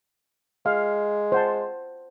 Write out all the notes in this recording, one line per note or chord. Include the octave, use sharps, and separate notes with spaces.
G#3 F5
C5 F#5 A5